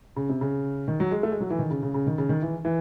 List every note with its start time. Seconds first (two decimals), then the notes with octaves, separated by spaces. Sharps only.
0.16 C#3
0.29 C3
0.41 C#3
0.88 D#3
1.00 F#3
1.11 G#3
1.23 A3
1.32 G#3
1.40 F#3
1.50 E3
1.59 D#3
1.71 C#3
1.83 C#3
1.94 C#3
2.07 D#3
2.18 C#3
2.29 D#3
2.42 E3
2.65 E3